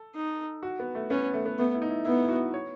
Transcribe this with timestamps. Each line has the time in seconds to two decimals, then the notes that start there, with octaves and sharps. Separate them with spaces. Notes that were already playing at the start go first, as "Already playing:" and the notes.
Already playing: A4
0.15 D#4
0.63 F#4
0.79 B3
0.95 A3
1.10 B3 C#4
1.34 A3
1.46 B3
1.58 A3 B3
1.74 E4
1.82 D#4
1.90 E4
2.05 B3 E4
2.24 E4
2.29 F#4
2.54 C#5